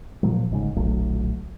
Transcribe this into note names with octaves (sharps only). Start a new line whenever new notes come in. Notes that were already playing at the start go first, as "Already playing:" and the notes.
A#2 F3 F#3
G1 G#2 C#3
D1 A#1 F#3 A3